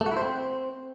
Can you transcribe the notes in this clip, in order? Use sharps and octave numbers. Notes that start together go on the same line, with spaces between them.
A3
F#4
E4
C5
C4